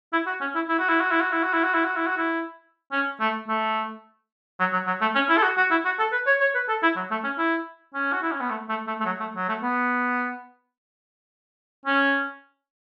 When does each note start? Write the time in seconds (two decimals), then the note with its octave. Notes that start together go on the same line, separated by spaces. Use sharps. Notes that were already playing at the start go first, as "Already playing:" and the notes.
0.13 E4
0.26 F#4
0.41 C#4
0.55 E4
0.69 E4
0.79 F#4
0.89 E4
1.01 F#4
1.12 E4
1.21 F#4
1.33 E4
1.43 F#4
1.54 E4
1.64 F#4
1.75 E4
1.85 F#4
1.96 E4
2.07 F#4
2.18 E4
2.92 C#4
3.20 A3
3.48 A3
4.60 F#3
4.73 F#3
4.87 F#3
5.02 A3
5.15 C#4
5.29 E4
5.37 A4
5.43 F#4
5.58 F#4
5.71 E4
5.85 F#4
5.99 A4
6.13 B4
6.27 C#5
6.41 C#5
6.55 B4
6.69 A4
6.83 E4
6.96 F#3
7.11 A3
7.24 C#4
7.38 E4
7.94 C#4
8.13 F#4
8.22 E4
8.32 C#4
8.41 B3
8.50 A3
8.69 A3
8.87 A3
9.01 A3
9.06 F#3
9.20 A3
9.36 F#3
9.48 A3
9.62 B3
11.86 C#4